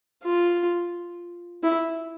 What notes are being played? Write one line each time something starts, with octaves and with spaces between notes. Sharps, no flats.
F4
E4